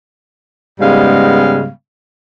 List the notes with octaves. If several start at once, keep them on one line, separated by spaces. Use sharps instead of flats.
G#2 C#3 G3 G#3 B3 F5